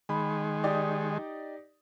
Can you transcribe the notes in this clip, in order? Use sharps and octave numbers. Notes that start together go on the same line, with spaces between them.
D#3 G#3 B5
D#4 G4 D5